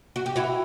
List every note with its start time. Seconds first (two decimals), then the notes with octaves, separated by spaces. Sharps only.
0.16 F#4
0.26 G4
0.36 E4 F#4